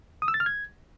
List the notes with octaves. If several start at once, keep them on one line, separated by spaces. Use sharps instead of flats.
D#6
E6
A6
F6
G#6